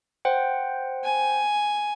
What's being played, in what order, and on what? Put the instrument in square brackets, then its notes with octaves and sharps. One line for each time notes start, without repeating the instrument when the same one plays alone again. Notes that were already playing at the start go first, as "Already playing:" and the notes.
[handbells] C5 F#5 G5
[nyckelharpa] G#5